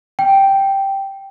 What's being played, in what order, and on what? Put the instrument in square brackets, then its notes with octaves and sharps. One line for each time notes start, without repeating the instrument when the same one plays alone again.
[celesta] G5